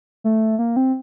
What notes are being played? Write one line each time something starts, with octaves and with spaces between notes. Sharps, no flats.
A3
A#3
C4